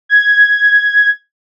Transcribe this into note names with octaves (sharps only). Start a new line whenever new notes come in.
G#6